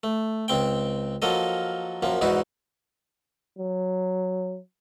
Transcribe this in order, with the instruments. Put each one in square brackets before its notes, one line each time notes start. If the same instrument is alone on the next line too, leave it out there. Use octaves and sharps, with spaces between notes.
[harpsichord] A3
C#2 C4 G5
F3 F#3 A#3 A4 D#5
F#2 F3 A#3
E2 G#2 D#4 E4 F#4
[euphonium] F#3